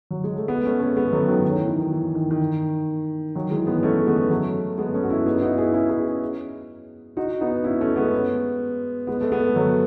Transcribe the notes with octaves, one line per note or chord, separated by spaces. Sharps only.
F#3
G#3
A3
G#3 B3
A3 C#4
A3 C#4
G#3 B3
F#3 A3
D#3 F#3
D#3
E3
D#3
D#3
E3
D#3
D#3
D#3 F#3
E3 G#3
G#3 B3
A3 C#4
G#3 B3
F#3 A3
G#3 B3
A3 C#4
F#4
C#4 E4
B3 D#4
E4
D#4 F#4
E4 G#4
C#4 E4
E4 G#4
D#4 F#4
B3 D#4
C#4 E4
A3 C#4
G#3 B3
G#3 B3
A3
G#3 B3
F#3 A3